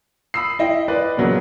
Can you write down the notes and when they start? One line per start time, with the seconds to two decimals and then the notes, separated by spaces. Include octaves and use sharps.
0.34 B5 D#6 E6 C7
0.59 E4 D#5 G5
0.88 B4 D5 D#5
1.17 A#2 C#3 F#3 A#3 B3